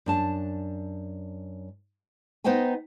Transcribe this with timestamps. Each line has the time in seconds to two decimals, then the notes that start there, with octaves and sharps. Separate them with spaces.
0.06 F#2 D4 A5
2.44 B3 D#4 C5 D#5 G5 G#5